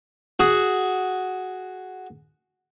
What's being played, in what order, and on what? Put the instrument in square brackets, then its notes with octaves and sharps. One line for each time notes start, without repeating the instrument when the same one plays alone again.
[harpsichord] F#4 G#4